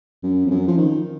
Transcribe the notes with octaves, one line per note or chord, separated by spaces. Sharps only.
F#2
F2
F#2
F3
D#3